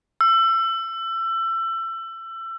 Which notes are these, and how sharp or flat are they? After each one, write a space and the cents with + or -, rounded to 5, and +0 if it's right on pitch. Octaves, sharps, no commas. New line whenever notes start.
E6 +30